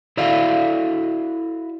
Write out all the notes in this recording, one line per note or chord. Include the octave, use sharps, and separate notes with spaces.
E4 F#4 A4 D5 E5 F5